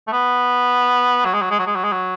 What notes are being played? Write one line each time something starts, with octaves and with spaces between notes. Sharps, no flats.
A3
B3
F#3
G#3
F#3
G#3
F#3
G#3
F#3
G#3
F#3